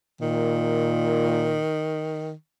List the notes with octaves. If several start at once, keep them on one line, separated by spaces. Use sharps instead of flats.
A#2 D#3